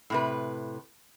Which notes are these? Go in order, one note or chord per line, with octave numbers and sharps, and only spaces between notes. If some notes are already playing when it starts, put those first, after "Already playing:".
A2 C3 B4